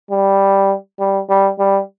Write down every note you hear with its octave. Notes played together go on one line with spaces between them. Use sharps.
G3
G3
G3
G3